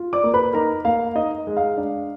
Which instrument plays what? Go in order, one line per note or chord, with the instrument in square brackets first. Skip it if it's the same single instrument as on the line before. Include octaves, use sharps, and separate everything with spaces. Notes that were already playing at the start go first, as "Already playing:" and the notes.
Already playing: [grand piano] F4
D5 D6
A#3
B4 B5
D#4 A#4 A#5
A#3 F5
D#4 D#5
G#3
F5
D4